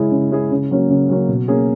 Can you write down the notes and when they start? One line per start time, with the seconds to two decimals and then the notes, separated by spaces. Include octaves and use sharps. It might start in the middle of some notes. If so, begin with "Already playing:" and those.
Already playing: C#3 G#3 C#4 E4 G#4
0.11 C#3
0.31 G#3 C#4 E4 G#4
0.51 C#3
0.71 F#3 A#3 C#4
0.90 C#3
1.09 F#3 A#3 C#4
1.28 B2
1.48 A#3 C#4 G#4